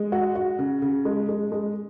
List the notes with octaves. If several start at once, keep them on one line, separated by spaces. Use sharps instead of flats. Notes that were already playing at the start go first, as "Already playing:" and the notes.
Already playing: G#3
F#4
F#4
C#3
C#3
G#3
G#3
G#3